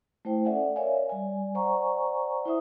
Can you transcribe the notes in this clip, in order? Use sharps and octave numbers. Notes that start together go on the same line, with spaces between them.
A3 E4 C5 G5
C#4 A4 D5 E5 F#5 G#5
A#4 C#5 D5 E5 F5 G#5
G3 D5 G#5
C5 D5 F#5 G#5 A#5 C#6
E4 C5 E5 D#6